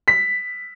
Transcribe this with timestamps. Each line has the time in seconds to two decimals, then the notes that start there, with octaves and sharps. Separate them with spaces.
0.08 B6